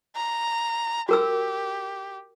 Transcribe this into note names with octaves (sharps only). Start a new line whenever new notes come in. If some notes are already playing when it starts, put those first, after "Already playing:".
A#5
F#4 G4 A#4 E6